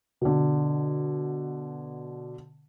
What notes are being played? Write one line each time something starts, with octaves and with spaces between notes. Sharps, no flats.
B2 D3